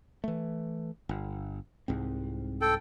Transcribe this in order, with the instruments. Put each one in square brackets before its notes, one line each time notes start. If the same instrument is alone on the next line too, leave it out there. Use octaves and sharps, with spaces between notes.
[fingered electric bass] E3 A3
G1
C2 G#2 C4
[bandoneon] A4 G5